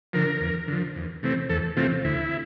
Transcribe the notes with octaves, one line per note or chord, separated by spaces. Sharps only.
D3 F3 A#4
E2
D3 F3
E2
C3 E3 A3 C4
E2 A4
C3 E3 A3 C4 F4
D2 E4